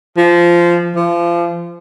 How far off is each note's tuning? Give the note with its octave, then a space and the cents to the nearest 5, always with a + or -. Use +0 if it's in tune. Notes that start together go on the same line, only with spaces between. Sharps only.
F3 -15
F3 -30